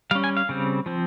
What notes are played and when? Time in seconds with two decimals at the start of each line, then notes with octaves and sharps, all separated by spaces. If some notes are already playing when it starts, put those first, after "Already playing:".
0.11 G3 C#4 F5
0.24 G#5
0.37 F5
0.49 C#3 G3 C4
0.86 F3 C4